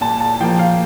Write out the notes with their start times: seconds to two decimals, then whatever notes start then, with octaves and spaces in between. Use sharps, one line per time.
0.01 A#2 A5
0.20 A5
0.40 F3 A#3 G5
0.59 F5